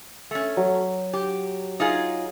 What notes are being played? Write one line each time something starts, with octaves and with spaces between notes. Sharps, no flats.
A3 C#4
F#3
G4
D#4 F4 G#4